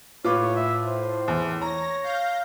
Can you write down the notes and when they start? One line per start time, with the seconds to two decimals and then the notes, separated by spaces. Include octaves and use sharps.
0.24 A2 F4 B4 C#5 D6
0.56 E5
0.86 C5
1.28 E2
1.62 C#5 A#5 A#6
2.04 F5 G6 A#6